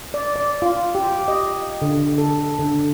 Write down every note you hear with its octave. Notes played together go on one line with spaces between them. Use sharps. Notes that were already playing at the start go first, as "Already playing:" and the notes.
D5
D5
F4
G4
D#5
D3
A4
D3